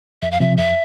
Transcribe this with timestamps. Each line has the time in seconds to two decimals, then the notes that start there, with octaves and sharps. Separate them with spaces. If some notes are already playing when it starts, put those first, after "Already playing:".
0.22 F2 E5
0.31 F5
0.40 C3 F3 E5
0.57 F2 E5